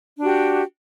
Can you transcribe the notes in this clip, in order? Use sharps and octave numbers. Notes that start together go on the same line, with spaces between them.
D4 F#4 G4